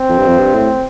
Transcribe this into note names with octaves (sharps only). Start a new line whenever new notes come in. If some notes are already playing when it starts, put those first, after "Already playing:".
Already playing: C4
F2
G2
F2
G2
A2